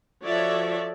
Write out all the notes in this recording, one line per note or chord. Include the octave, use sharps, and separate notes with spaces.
F3 F#4 A4 C#5 D5 E5